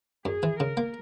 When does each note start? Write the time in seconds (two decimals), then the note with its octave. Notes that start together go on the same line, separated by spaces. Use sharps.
0.25 F#2 G#4
0.43 E3
0.59 C#3 A#4
0.77 A#3